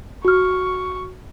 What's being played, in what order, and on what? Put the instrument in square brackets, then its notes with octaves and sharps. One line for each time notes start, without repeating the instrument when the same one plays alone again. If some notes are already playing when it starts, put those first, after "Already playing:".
[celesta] F#4 F6 [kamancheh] C#6